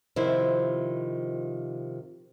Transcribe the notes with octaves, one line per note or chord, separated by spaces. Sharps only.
C3 D#3 F3 C4 E4